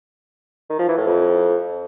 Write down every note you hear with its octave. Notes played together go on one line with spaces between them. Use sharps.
D#3
F3
E3
A2
F2